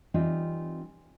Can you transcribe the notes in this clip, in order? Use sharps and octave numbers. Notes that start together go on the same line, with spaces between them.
E3 G3 C4 D#4 F4 G5